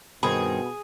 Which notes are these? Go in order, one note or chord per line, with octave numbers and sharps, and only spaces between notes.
G2 B2 D#3 C4 G#4 B5